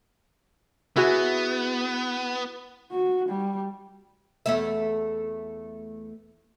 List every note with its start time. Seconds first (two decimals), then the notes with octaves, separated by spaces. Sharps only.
0.96 B3 E4 F#4 G#4
2.92 F#4
3.29 G3
4.46 E2 A3 E5